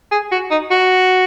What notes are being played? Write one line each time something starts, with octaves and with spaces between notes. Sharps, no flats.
G#4
F#4
D#4
F#4